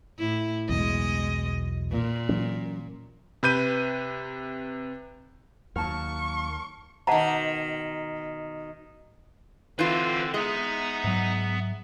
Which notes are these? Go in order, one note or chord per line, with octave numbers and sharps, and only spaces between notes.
A2 E4
B1 E2 B2 G#3 D#5
A#2
E3 F#3 C#4
C3 B4 G6 D#7
D#2 F#3 A#3 A5 C#6 F6
B2 D#3 F#5 A5 A#5
D3 E3 C4 F4 B4 C5
G#3 B3 D#5 E5 A#5
G#2 F#3